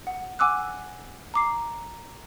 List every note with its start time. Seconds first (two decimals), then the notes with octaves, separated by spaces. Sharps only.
0.07 F#5
0.39 F#5 G#5 D6 E6 F#6
1.34 A#5 D6 C7